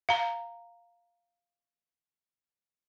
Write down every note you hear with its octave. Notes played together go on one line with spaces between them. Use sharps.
F5 A#5